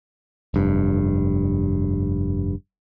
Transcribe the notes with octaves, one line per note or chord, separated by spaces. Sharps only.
F1 G2